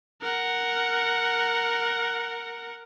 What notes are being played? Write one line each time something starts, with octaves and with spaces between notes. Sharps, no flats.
A#4 F#5